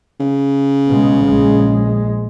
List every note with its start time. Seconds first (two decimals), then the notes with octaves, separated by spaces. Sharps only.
0.20 C#3
0.88 B2 G#3
1.25 A#1 G#3